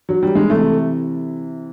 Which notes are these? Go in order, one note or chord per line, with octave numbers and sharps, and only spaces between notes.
F#3
G3
G#3
C3 E3 A3